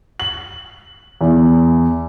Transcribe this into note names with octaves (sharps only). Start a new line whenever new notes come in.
F#7
E2